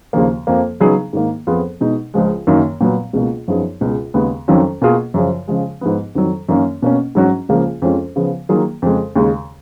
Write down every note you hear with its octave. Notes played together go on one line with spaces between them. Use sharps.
D#2 C#3 F3 A#3
F2 F3 A#3
C#3 F#3 B3 D#4 G#4
G#2 D#3 A#3
F2 F3 B3 F4 G#4
B2 G#3 D#4
C#2 C#3 F3 G#3
F#2 D#3 F#3 A#3
A#2 F#3 B3
C#2 B2 A#3
F#2 F3 B3 D#4 G#4
C#2 B2 G#3
D#2 C#3 G#3 B3
F2 D#3 F#3 C#4 F4
B2 A#3 F4 G#4
F#2 C#3 F3
C#3 F3 G#3
G#2 F3 B3
F2 D#3 F#3
F#2 D#3 A#3 C#4
B2 A#3 C#4
G#2 F#3 C#4 F#4
C#2 C#3 F3 A#3
F2 F3 G#3 C#4 F4
C#3 F3 B3
D#3 F#3 A#3 F4 G#4
F2 C#3 G#3
D#2 C#3 G#3